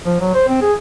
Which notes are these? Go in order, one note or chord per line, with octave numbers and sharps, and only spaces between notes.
F3
F#3
C5
C4
G#4